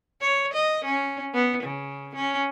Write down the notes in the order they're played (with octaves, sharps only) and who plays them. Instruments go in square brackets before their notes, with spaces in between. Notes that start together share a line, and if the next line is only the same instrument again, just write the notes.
[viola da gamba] C#5
D#5
C#4
B3
C#3
C#4